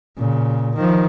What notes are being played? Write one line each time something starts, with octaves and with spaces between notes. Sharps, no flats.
A#2 C#3
D#3 F3